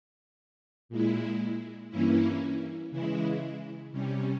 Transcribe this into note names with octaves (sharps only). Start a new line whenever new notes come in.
A#2 G#3 E4
G2 E3 A#3 C#4 E4
C#3 E3 G#3 E4
C3 G3 C#4